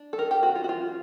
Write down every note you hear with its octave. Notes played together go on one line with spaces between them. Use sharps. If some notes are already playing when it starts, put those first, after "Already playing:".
Already playing: D4
A4
D#3 A#4
G4
C4 F#4
F4
F#4
E3 F4